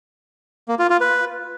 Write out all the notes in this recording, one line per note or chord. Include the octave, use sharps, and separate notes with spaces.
A#3
F4
F4
B4